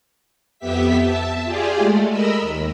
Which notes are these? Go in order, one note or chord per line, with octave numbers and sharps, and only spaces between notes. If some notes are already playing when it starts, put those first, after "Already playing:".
F2 B3 G4 E5 B6
E5 A5
F4 G4 G#4 D5 G#5
G#3 A3
A#4 D#5 B5 E6
D#2